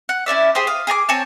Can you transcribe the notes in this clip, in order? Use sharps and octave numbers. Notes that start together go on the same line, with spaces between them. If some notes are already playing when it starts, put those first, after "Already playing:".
F#5
C#4 E4 D5 E5
G4 G#4 C5
F5 D#6
G#4 G#5 A#5 D6
C4 C#5 G#5 A5